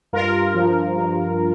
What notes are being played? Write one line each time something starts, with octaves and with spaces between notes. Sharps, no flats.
G2 F4 A#4
F3
G2